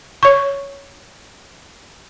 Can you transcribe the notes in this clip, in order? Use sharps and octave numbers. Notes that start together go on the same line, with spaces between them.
C#5 C#6